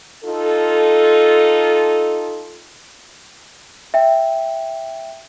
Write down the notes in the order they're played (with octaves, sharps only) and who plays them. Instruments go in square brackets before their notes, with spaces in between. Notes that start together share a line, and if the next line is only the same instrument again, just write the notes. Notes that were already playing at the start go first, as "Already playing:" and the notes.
[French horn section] D#4 F4 A4
[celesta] E5 G5